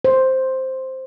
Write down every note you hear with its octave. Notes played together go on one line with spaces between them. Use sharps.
C5